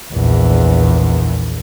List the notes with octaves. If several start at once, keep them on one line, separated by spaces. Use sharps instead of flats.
A#1 E2